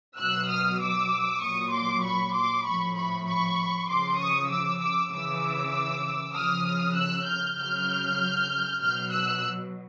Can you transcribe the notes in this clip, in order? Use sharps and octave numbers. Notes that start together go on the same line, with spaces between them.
B2 F#3 E6 F#6
D#6 F6
D6 E6
A#2 F#3 C#6 D#6
C6 D6
B5 C#6
C6 D6
A2 F3 B5 C#6
B5 C#6
B5 C#6
C#3 F3 C6 D6
C#6 D#6
D6 E6
D6 E6
C#3 E3 D6 E6
C#3 F3 D#6 F6
E6 F#6
F6 G6
C#3 F#3 F6 G6
B2 F#3 F6 G6
E6 F#6